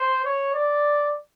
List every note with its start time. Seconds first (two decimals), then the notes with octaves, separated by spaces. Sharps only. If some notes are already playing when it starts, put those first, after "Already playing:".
Already playing: C5
0.25 C#5
0.54 D5